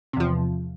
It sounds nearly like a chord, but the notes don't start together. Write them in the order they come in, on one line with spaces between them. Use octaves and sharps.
C3 E2 F3